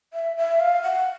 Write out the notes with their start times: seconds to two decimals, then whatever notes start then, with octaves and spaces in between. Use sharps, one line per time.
0.13 E5
0.37 E5
0.60 F5
0.83 F#5